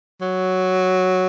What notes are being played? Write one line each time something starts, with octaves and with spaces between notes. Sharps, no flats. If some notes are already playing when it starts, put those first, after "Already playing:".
F#3